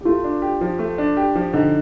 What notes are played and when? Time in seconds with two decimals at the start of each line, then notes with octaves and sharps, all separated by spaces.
0.01 G4
0.05 A3 F4
0.24 D4
0.42 G4
0.61 F3
0.79 A3
0.98 D4
1.17 G4
1.36 F3
1.53 D3 D#4